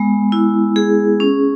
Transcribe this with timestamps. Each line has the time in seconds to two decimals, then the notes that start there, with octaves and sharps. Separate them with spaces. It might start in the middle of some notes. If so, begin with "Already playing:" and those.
Already playing: G#3 B3
0.32 E4
0.76 G#4
1.20 C#4